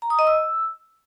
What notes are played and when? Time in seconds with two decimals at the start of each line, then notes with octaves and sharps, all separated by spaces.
0.02 A#5
0.10 D#6
0.19 D#5
0.27 E6